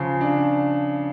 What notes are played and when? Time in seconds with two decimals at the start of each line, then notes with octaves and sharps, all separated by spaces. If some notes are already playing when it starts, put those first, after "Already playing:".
Already playing: C#3 F3
0.21 D4